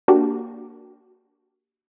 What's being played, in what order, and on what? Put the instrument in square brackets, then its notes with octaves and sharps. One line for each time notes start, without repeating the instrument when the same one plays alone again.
[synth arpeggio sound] A#3 D4 F#4 G4